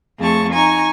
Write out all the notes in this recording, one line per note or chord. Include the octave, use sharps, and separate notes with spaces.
F2 A3 G#4 A5 C#6
D#4 G#5 A#5 C#6